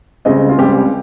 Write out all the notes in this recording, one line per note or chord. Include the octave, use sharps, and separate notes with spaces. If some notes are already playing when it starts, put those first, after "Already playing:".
C#2 C#3 G3 C4 D#5
F4
C#2 C#3 G3 C4 G4